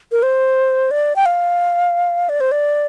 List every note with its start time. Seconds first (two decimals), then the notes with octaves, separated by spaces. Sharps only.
0.12 A#4
0.23 C5
0.91 D5
1.16 G5
1.26 F5
2.29 D5
2.40 C5
2.52 D5